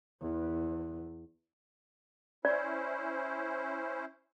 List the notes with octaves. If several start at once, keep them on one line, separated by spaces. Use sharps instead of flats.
E2
C#4 E4 C5 D5